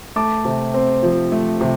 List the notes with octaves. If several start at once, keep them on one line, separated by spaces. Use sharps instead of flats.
A3 A5 D6
C3
C4
F3
A3
C3